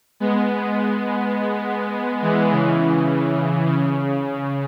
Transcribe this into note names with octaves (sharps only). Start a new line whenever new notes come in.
G#3 B3
E3 G#3
C#3 E3
C#3